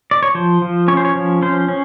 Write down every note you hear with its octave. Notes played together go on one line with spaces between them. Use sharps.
D5
C#5
F3 C5
F3
C#4 C#5
C5
C#5
F3
C#4 C5
C#4